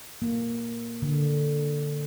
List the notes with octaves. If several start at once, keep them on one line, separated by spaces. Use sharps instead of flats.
A#3
D3